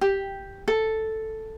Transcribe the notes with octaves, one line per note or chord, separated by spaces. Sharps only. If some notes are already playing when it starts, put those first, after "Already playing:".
G4
A4